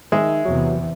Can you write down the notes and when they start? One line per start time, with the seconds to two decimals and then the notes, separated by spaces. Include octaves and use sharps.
0.12 D#3 G#3 E5
0.45 E2 C3 E3 F#3